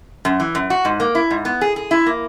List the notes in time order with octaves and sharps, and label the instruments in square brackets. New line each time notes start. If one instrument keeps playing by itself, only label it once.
[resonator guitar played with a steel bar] F#2
E3
F#2
F#4
G#2
A#3
E4
G#2
B3
G#4
G#4
E4
A#3